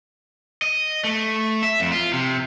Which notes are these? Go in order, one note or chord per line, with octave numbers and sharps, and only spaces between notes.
D#5
A3
E5
F2
F4
C3